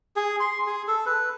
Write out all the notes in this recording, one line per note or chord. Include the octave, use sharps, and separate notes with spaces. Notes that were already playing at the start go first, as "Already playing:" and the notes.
G#4
C6
G#4
A4
B4